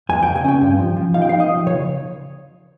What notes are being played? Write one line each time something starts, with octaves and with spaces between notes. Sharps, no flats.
F2 G#5
G5
C#3
G#5
C#4 G5
G2
F3
F3
D#4 F5
G5
D#4 F5
D#5
F3
C#3 C#5